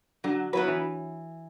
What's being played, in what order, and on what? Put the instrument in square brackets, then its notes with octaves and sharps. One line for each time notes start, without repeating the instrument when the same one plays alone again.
[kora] D3 [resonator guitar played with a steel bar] F#3
[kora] F#3 [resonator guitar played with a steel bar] B3 E4 B4
[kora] E3